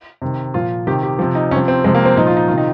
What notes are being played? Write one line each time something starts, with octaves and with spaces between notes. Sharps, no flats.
C3 D#3
A#2 F3 F4
C3 D#3 G4
G4
C3 F3
D#4
C3 F3 C#4
C4
C3 F3 G#3
A#3
C4
A#2 F3 D#4
F4
D#4
C3 D#3 F4
D#4